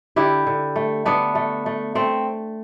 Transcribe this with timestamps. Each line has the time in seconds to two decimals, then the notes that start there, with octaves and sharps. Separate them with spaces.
0.16 D3 E4 G4
0.47 D3
0.76 A3
1.05 A3 B3 D4
1.35 A3
1.66 A3
1.95 A3 C4